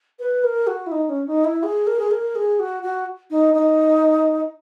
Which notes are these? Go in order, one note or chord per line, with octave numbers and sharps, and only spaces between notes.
B4
A#4
F#4
E4
D#4
C#4
D#4
E4
G#4
A#4
G#4
A#4
G#4
F#4
F#4
D#4
D#4